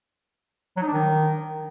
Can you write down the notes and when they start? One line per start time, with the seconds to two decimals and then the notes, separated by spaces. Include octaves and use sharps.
0.77 F#3
0.82 D#4
0.87 D4
0.93 D#3